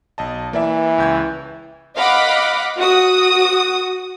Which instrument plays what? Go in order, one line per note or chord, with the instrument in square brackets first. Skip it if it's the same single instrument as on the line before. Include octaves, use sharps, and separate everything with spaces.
[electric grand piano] B1 D#5 A5
[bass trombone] E3 [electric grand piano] A#3 D5 E5
[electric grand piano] C#2 G6 G#6
[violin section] D#5 F5 F#5 B5 D6
F#4 D#6